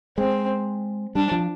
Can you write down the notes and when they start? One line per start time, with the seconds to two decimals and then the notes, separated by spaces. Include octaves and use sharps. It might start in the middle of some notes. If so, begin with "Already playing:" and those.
0.18 G#3 C4
1.15 G3 D4
1.31 F3